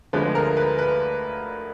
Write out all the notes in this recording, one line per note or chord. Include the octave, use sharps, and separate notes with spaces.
D2 D3 F3 G#3 B4
A#4
B4
B4